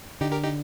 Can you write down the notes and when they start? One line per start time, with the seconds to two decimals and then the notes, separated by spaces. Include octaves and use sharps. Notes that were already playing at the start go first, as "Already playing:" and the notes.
0.21 D3 D#4 G4
0.32 G4 A#4
0.43 D#4 G4